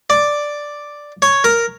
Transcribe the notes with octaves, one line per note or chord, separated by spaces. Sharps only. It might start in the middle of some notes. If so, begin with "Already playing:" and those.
D5
C#5
A#4